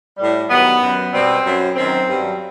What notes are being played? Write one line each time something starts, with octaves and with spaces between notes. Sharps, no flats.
A2 G3
G2 D#3 F#3 B3
F#2 F#3
B2 G3 C4
F#2 F#3
F#2 D#3 F#3 C4
G2 F#3